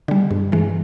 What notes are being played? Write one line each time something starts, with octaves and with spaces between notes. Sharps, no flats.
D3 G3
G2
E3 G#3